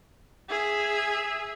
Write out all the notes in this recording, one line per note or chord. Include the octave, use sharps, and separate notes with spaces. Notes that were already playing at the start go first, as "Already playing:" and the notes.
G#4 E5